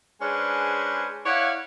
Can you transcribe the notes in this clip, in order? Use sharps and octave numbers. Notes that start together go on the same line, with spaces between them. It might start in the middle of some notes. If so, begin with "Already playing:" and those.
G#3 C#4 D4 G#4 B4 C5
E4 C#5 D5 F5 F#5